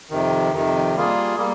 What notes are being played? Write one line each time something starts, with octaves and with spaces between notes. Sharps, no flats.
F2 C3 D#3
F2 C3 D#3
G3 A#3 F4 G#4
G3 A#3